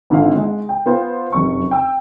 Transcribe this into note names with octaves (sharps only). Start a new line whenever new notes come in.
G#1 D3 F3 F5
G#3
G5
B3 F4 C5 F5
F1 F#2 C#6
G5 E6